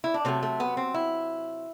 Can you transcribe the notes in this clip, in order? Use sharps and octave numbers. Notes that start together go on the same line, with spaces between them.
E4
D4
C3 F#3 A3 C4
A3
B3
C4
E4